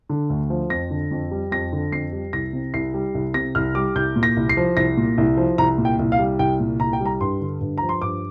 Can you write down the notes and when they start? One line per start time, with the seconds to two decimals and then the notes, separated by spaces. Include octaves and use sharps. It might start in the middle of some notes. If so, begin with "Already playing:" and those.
0.09 D3
0.30 D2
0.50 F3
0.70 F2 A#6
0.91 D3
1.11 F2
1.31 G3
1.51 F2 A#6
1.72 D3
1.92 F2 C7
2.13 G3
2.33 C2 A#6
2.53 C3
2.74 C2 C7
2.94 G3
3.15 C2
3.34 C3 A#6
3.55 C2 F6
3.75 G3 D6
3.95 C2 G6
4.16 A#2
4.23 A#6
4.37 C2
4.49 C7
4.57 F3
4.77 C2 A#6
4.97 A#2
5.18 C2
5.37 F3
5.58 C2 A#5
5.78 A#2
5.85 G5
5.99 C2
6.12 F5
6.19 G3
6.39 C2 G5
6.60 A#2
6.80 C2 A#5
6.93 G5
7.00 G3
7.06 A#5
7.20 G2 C6
7.40 D3
7.61 G2
7.78 F3 A#5
7.89 C6
8.02 G2 D6